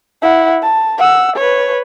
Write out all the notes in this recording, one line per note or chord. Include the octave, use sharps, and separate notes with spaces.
E4 F#5
A5
F#5 E6
B4 C#5